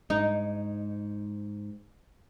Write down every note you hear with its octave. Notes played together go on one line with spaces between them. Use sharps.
G#2 D#4